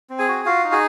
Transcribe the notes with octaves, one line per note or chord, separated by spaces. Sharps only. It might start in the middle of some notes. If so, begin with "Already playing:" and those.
C4
G#4 G#5
F#4
F4 F#4 F5
D#4
G#4 G#5